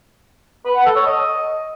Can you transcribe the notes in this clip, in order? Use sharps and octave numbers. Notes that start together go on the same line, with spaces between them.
B4
F#5
A4
C#5
D#5